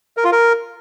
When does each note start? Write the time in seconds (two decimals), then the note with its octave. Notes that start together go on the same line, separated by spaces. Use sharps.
0.17 A#4
0.24 F4
0.32 A#4